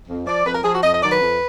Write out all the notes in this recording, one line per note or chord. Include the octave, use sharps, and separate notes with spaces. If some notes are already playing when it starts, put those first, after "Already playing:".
F2
F3 D5
F2 B4
A#4
F3 G#4
F#4
F2 D#5
D#5
D#3 F#3 D5
B4
F2